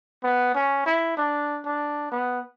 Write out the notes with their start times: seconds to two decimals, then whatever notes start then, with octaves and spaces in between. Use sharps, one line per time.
0.24 B3
0.55 C#4
0.86 E4
1.17 D4
1.65 D4
2.12 B3